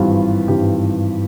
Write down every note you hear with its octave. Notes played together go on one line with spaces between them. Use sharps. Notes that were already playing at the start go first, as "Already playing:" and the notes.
Already playing: G#1 G2 E3 F4 G4
G#1 G2 E3 F4 G4